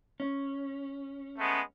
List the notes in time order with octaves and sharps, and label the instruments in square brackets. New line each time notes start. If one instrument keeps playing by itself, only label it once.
[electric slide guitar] C#4
[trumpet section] G#3 A3 B3